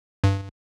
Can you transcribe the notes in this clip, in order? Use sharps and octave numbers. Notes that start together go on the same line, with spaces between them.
G2